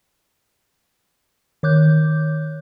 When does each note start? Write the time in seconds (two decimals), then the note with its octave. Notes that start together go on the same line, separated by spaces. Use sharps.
1.63 D#3 C#5 D6 F#6 G6